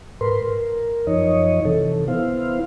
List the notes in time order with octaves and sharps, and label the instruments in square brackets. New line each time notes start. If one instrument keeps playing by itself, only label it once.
[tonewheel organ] G#2 A#4 B4 C6
A#4
F#2 F3 D#4 C#5 D#5
C3 E3 A4
B3 E4 C5 F5